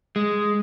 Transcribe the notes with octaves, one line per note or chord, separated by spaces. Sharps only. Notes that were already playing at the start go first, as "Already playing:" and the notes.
G#3